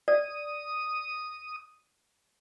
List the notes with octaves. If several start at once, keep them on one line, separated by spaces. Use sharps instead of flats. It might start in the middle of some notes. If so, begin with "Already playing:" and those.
D5 D#6